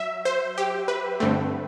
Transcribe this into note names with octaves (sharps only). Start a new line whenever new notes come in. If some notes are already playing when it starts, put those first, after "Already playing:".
Already playing: F#3 E5
C5
G4
B4
G2 D3 A3 C4